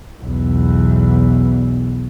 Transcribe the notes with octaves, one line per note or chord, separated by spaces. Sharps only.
B1 E2